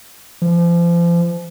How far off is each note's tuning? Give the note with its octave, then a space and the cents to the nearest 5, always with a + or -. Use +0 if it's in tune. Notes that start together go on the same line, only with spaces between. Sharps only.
F3 -35